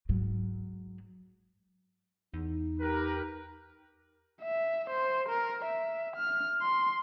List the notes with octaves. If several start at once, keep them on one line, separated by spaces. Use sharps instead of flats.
G#2 F#3
E2 D#4
G4 A#4 B4
E5
C5
A#4
E5
F6
C6